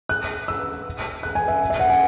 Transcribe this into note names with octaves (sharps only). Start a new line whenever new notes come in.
F#6
E6
F#6
G#5
E5
E5
F#5
G#5